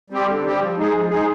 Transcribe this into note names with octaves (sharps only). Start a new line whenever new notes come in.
G3 C4 G4
D3
G3 C4 G4
F3
G#3 D#4 G#4
F3
G#3 D#4 G#4